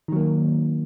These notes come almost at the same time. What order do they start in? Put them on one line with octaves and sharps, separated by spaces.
D#3 F#3 A#3